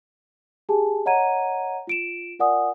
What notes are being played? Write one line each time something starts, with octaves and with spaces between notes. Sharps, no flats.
G4 G#4 G#5 A5
C#5 D#5 F#5 A#5 G#6 D#7
F4 D7 E7
F4 A#4 D5 F#5 G#5 D#6